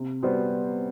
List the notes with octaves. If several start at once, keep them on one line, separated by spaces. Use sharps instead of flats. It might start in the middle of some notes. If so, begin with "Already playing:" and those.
Already playing: C3
G3 B3 F#4 C5